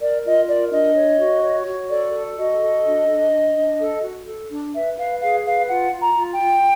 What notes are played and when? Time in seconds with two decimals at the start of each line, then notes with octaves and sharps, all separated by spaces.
0.01 A#4 D5
0.24 F4 D#5
0.48 A#4 D5
0.72 D4 D#5
0.96 C#5
1.20 F#4
1.43 C#5
1.67 F#4
1.90 A4 D5
2.14 A4
2.37 F#4 D#5
2.61 A4
2.85 D4
3.08 D4
3.33 D4
3.56 D4
3.79 A4
4.03 F#4
4.27 A4
4.50 D4
4.74 B4 E5
4.97 B4 F5
5.21 G#4 F5
5.45 B4 F5
5.68 F4 F#5
5.92 F4
6.00 A#5
6.15 F4
6.32 G5
6.39 F4